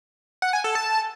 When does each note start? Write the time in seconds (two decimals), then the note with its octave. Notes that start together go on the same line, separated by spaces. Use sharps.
0.42 F#5
0.53 G#5
0.64 A4
0.75 A5